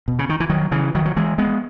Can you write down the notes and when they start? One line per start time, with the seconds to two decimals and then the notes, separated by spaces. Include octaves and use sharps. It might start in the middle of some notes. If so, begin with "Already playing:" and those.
0.08 B2
0.19 C#3
0.29 D#3
0.40 E3
0.50 D#3 F#3
0.71 C#3 E3
0.95 D#3 F#3
1.05 F#3
1.16 E3 G#3
1.38 G#3 B3